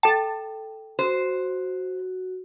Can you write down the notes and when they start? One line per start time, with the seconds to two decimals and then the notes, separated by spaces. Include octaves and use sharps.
0.03 A4 G5 A5 A6
0.99 F#4 C5